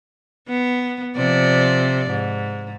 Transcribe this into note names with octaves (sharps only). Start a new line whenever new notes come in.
B3
C3 F3 D5
G#2